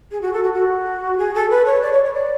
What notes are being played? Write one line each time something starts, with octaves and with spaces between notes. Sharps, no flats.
G#4
F#4
A4
F#4
F#4
G#4
A4
B4
C#5
D5
C#5
C#5
D5